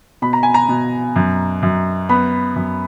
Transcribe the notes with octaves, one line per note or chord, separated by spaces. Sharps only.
B2 B5
A#5
G#5
A#5
B2
F#2
F#2
B3 B5
F#2